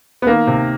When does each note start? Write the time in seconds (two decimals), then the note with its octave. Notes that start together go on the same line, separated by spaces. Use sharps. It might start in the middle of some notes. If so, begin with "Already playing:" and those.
0.22 B3
0.27 D#3 A#3
0.47 C3